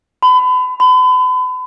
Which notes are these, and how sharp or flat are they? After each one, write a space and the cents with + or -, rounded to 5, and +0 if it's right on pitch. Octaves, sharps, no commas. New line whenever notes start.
B5 +35
B5 +40